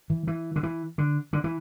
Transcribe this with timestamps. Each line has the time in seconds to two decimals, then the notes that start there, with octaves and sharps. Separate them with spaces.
0.10 E3
0.27 E3
0.56 D3
0.63 E3
0.98 D3
1.33 D3
1.44 E3